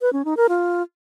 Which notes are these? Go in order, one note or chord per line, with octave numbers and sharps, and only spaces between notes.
B4
C#4
D#4
A#4
F4